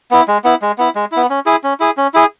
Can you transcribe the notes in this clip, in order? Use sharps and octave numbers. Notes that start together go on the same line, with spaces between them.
B3 E4
G#3
B3 E4
G#3
B3 E4
G#3
B3 E4
C#4
E4 G#4
C#4
E4 G#4
C#4
E4 G#4